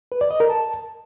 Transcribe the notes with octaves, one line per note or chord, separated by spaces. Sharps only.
B4
D5
D#5
A#4
A5